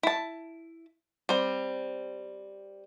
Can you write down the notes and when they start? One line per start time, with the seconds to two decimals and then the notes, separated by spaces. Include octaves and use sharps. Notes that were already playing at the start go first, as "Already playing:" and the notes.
0.03 E4 A5
1.29 G3 C4